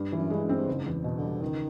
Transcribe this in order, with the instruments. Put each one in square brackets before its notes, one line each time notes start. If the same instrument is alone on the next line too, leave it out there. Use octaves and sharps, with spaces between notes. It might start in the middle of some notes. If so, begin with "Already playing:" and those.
Already playing: [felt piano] G2
E3
[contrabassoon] F#2
[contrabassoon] G2 [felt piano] G#3
[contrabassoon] F#2
[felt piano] C4
[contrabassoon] G2
[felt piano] F#1 [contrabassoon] G#2
[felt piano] E2
B2
[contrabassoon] D3
[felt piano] G3
[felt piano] C#2 [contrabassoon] D#3